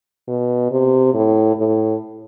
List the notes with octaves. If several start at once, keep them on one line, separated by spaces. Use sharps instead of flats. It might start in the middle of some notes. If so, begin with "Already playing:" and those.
B2
C3
A2
A2